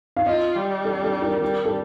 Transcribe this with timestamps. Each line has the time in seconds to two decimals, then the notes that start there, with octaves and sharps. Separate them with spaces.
0.17 F5
0.26 F4 D#5
0.55 G3
0.85 A4
1.04 A4
1.22 A#4
1.42 G3 A#4
1.65 A4